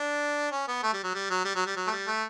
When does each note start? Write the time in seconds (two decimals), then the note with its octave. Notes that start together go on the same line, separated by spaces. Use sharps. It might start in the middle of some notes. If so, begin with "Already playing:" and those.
Already playing: D4
0.51 C#4
0.68 B3
0.83 A3
0.93 G3
1.03 F#3
1.14 G3
1.30 F#3
1.45 G3
1.55 F#3
1.66 G3
1.76 F#3
1.87 A3
1.92 G3
2.07 A3